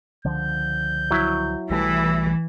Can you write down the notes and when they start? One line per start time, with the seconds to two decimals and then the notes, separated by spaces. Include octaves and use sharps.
0.25 C#2 D3 F3 G6
1.11 F#3 E4
1.70 B1 E3 G3 A3 E6